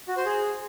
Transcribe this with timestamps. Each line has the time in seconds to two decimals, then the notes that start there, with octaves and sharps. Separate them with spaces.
0.08 F#4
0.17 C5
0.26 G#4